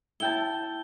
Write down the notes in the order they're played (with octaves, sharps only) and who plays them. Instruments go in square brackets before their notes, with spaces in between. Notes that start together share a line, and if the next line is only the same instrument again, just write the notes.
[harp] E4 G5 A5 [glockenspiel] G7